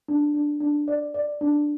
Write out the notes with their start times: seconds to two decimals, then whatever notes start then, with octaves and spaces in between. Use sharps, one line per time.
0.08 D4
0.34 D4
0.61 D4
0.88 D5
1.14 D5
1.41 D4